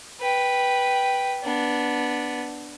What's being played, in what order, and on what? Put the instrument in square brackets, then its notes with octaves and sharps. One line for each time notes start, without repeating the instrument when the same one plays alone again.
[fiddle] B4 G5
B3 D4